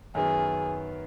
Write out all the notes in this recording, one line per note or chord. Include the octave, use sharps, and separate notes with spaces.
F#2 D#3 B3 G#4